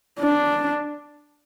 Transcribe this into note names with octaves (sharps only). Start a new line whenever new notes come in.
D4